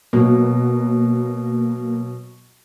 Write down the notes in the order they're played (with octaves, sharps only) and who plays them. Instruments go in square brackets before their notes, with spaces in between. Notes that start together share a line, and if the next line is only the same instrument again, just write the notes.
[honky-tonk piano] B2 F#3 [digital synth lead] A#3